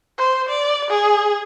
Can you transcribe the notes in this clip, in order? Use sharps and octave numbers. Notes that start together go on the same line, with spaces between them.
C5
D5
G#4